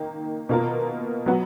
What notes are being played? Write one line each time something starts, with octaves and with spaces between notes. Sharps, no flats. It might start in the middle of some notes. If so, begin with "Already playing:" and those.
Already playing: D#3 A#3
B2 A#3 F4 A#4
F#3 B3 F#4